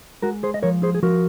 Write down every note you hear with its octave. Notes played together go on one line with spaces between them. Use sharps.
G#3 F#4 A#4
G#4 C5
D#5
F3 A#4 C#5
G#4 C5
G#4
F3 F#4 A#4